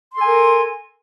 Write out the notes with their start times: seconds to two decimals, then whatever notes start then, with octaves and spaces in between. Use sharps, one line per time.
0.13 C6
0.17 A4
0.21 G#5
0.25 A#4